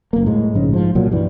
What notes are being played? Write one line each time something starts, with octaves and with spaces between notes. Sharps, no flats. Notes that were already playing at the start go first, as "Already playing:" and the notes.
F#1 A#3
A2 G#3
A#1 G#2 C#3 G#3
G#2 F3
C2 A#2 F#3
G2 E3 G3